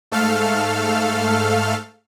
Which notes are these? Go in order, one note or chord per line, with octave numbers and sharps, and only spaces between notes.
G#2 A3 A4 F5 F6